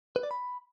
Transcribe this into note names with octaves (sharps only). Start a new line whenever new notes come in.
B4
D5
B5